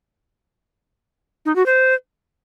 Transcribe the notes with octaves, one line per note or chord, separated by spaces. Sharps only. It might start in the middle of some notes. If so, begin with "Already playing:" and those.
D#4
F#4
C5